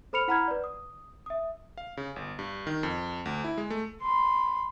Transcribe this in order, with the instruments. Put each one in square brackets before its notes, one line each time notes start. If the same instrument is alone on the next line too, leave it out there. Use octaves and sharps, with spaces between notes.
[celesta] A4 C5 B5 F6 C#7 F7
E4 F#5 A#5 B5 F6 G#6
B4 D5
D#6
E5 D#6
[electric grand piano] F5
C#3
G1
G2
D#3
F2
D2
E4
G#3
A3
[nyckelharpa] B5 C6